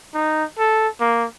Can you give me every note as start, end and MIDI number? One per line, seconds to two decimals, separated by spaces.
0.14 0.44 63
0.58 0.88 69
1.00 1.25 58